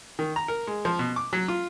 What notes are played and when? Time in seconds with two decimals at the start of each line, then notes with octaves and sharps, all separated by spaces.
0.19 D#3
0.36 A#5
0.48 A#4
0.67 G#3
0.85 F3
0.99 B2
1.16 D6
1.33 F#3
1.48 F4